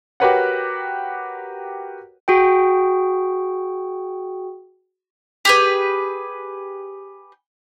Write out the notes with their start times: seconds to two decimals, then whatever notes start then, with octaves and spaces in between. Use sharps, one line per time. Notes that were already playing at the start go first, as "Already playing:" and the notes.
0.20 F#4 G4 A#4 B4 C#5 F#5
2.28 F#4 G#4 G5
5.45 G4 G#4 B4